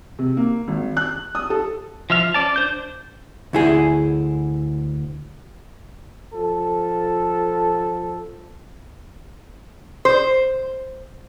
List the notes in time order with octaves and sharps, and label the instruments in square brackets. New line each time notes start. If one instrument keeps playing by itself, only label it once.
[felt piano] C3
A#3
G#1
F#6
D#6
A4
[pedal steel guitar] F3 E5 F6
C#4 D5 A5
D4 C5 G6
[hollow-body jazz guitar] D2 E4 G#4
[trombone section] F3 A4
[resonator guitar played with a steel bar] C5